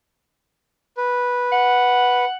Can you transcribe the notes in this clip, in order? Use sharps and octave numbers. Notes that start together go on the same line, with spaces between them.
B4
F#5